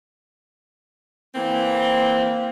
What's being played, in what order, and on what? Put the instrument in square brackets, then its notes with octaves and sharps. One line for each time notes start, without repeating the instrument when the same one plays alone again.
[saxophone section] E3 C4 [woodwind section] A#3